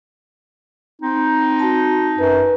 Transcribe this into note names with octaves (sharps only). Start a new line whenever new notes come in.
C4 D#4
F#4 A5
F#2 B4